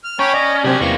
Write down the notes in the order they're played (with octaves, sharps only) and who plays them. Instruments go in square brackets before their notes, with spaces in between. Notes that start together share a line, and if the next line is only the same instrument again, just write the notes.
[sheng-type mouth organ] F6
[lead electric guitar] C#4 [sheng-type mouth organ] C#5 G5 B5 [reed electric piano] A#5 C#6 D6
[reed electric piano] D5 [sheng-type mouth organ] D#5
[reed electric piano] C3 F#3 C4 [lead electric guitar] D4 G#4 [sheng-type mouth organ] G4
[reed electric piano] E2 E3 [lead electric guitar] G3 A#3 [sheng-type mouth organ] C#6